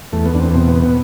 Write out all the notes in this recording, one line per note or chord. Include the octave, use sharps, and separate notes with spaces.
E2 A3
B3
E2 D4
C4
B2 C4
B3
B2
B3